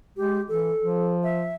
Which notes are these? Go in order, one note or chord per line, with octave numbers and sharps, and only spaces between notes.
G#3 G4
E3 A4
F3
E5